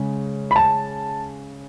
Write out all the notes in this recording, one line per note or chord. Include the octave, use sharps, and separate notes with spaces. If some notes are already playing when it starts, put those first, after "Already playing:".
Already playing: C#3 G#3
B5
A5